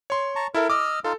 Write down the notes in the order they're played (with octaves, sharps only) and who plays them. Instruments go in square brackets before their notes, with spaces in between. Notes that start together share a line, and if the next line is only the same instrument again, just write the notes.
[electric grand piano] C#5 C6
[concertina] A5 A#5 C#6
[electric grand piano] E4 A4 E5 [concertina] A#4
[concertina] D#5 E6 F6 [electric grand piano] D6
[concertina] D#4 F4 F5 [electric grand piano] A4